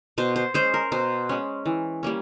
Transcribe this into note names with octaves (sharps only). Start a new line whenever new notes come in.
B2 C5
C5
G#3 C#4 C5
A#4
B2 C5
G#3 C#4
E3
G3 A#3 C#4